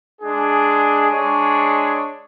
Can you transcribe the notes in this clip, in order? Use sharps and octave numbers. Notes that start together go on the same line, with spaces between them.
G#3 D4 G#4
G#3 D4 G#4 C#5